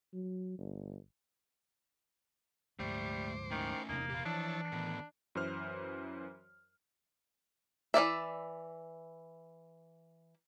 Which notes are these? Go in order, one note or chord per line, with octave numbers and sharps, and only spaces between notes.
F#3
G1
D2 G#2 G3 A3 C5 D6
D#3 A3 C#4
E1 E2 C3 A#3 D#4
A#2 G4 F5
E3 F3 D4 E4 C#5 A5
A2 D#3 B3
F#2 E3 C5 F6
E3 F3 D5 E5